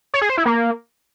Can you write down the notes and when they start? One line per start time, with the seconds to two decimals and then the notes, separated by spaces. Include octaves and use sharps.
0.14 C#5
0.22 G#4
0.30 C5
0.38 E4
0.46 A#3